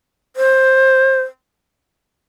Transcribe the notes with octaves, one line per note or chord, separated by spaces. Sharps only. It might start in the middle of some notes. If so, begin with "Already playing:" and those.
C5